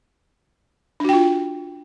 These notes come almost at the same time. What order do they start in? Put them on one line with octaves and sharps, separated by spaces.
D4 F#4 G5 F4